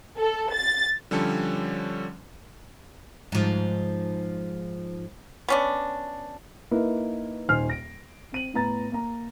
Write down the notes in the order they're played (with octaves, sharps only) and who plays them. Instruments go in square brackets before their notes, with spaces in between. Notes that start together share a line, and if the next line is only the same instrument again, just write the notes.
[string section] A4
A6
[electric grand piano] D3 F3 G3 C#4 A4 C#5
[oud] G#2 F3
[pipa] B3 C#4 D4
[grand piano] A#3 D#4 E4 A#4 B4
D#1 D#3 C5 G#5 F6 C7
A#6 D7
C4 D#7 F#7
A2 B3 A#5 A6
A#3 A#5